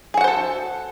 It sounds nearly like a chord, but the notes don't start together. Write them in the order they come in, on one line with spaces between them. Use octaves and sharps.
G#4 F#4 F#5 C5 A4